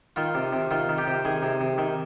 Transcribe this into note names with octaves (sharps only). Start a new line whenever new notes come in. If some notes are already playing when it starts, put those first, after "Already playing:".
D#3 F4
C3
C3
D#3 F4
D#3
G4
C3
D#3 G#4
C3
C3
D#3